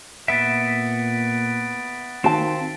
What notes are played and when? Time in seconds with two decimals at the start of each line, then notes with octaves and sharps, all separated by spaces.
0.28 A#2 B3 E5 A6 B6 D7
2.24 D#3 C4 F#4 F5 A5